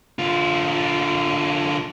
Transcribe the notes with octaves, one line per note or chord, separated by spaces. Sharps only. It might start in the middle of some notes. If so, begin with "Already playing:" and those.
D3 F4